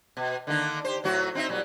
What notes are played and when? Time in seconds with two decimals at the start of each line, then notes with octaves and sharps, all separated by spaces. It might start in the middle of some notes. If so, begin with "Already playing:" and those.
0.17 B2
0.47 D3 D#3 A#3
0.85 G4 C5
1.04 A2 F#3 F#4
1.35 C4 D#4 E5
1.49 A#2 F#3 G3